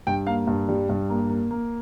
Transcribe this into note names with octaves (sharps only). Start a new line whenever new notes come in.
G2 G5
A#3 F5
G2
G3
G2
A#3
A#3
A#3